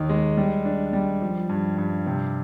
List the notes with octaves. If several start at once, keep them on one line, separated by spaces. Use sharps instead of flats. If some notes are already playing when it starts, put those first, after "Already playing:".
Already playing: D#2 D#4
G#3
G3
D4
G3
F3
G2
G2
C3